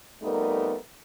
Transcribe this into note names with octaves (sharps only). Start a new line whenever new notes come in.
F2 G3 A3 B3 D#4 A#4